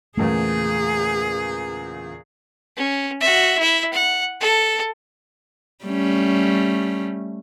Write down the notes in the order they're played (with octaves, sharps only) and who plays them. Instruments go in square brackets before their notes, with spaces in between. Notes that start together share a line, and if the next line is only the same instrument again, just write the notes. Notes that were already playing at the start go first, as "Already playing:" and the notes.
[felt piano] E2 A#2 C#3 [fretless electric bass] A3 [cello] G#4
[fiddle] C#4
F#4 E5
E4 E5
F#5
A4
[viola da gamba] G3 A3 C#4